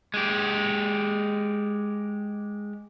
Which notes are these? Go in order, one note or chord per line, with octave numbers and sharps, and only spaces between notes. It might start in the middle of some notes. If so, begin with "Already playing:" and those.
G#3 G4